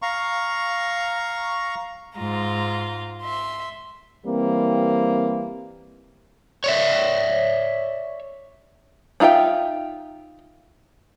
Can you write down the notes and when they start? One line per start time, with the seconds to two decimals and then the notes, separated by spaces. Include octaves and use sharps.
0.02 F5 A#5 C#6
2.18 G#2 F4 A#5
3.22 E5 C6
4.26 E3 G3 A#3 C4
6.64 C#5 D5 E5
9.20 D4 D#4 F4 E5 G5